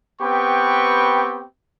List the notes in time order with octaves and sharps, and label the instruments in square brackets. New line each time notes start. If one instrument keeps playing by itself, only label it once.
[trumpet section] B3 C4 G4 B4 G5 C#6